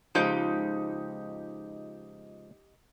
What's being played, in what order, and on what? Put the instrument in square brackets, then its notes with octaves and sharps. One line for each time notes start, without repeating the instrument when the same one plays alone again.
[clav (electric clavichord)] C#2 F3 [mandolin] D#4 G4 G6